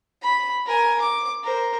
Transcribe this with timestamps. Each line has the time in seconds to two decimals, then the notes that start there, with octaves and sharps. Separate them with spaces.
0.22 B5
0.66 A#4 G#5
1.01 D6
1.44 A#4 C5